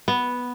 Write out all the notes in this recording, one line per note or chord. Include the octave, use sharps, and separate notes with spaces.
B3